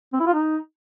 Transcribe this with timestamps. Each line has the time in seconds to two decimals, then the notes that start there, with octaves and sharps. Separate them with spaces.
0.13 C4
0.20 E4
0.27 F4
0.34 D#4